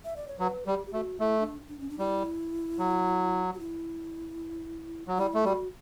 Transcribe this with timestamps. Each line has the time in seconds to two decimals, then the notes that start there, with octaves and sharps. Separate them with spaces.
0.04 E5
0.16 D5
0.28 C#5
0.40 F#3 B4
0.66 G3 G4
0.86 G4
0.93 A3 F#4
1.20 A3 E4
1.39 D4
1.68 D4
1.80 C#4
1.90 D4
1.99 G3 E4
2.79 F#3
3.54 F#4
3.59 E4
5.08 F#3
5.18 G3 E4
5.34 A3
5.45 G3 F#4